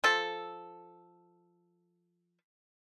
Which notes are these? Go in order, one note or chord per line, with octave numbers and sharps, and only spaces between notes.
F3 A4